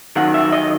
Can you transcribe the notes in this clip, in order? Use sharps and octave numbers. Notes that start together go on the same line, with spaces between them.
D#2 D#3 F#3 F#5
E5
D#5